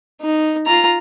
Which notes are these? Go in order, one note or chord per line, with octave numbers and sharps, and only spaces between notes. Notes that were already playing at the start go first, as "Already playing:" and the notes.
D#4
F4 A#5